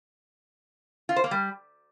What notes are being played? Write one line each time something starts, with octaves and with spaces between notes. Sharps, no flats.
F4
C5
A#3
G3